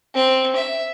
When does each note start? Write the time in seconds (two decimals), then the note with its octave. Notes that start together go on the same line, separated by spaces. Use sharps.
0.14 C4
0.56 E5